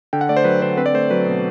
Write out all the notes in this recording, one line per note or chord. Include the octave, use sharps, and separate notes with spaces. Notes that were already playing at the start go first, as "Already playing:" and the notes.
D3 G5
F#5
A3 D5
C5
F#3 B4
D3 C5
C4 B4
D5
A3 C5
F#3 B4
B2